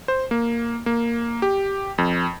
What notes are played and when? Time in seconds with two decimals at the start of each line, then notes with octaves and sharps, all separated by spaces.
0.08 C5
0.31 A#3
0.86 A#3
1.42 G4
1.98 F2